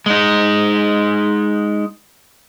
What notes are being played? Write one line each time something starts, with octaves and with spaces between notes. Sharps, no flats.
G#3 D#4